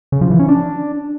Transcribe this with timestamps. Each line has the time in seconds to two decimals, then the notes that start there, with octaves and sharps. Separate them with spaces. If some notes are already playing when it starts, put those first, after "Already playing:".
0.12 C#3
0.21 F3
0.30 E3
0.39 C#4
0.49 D4